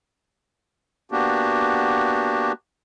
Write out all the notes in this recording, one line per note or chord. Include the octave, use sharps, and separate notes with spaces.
A#3 B3 D4 F#4 G4